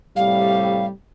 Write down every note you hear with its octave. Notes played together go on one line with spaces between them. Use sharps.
A2 C3 G3 F5